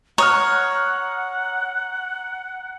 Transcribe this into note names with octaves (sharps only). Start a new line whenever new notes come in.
C#5 F#5 A#5 D#6 F6